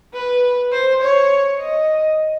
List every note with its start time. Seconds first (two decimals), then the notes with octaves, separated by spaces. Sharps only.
0.14 B4
0.72 C5
1.02 C#5
1.60 D#5